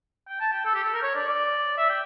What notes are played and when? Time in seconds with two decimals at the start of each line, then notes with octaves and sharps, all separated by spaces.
0.28 G5
0.40 A5
0.53 G5
0.65 A4
0.75 G4
0.84 A4
0.94 A#4
1.03 C#5
1.15 D5
1.28 D5
1.78 E5
1.90 G5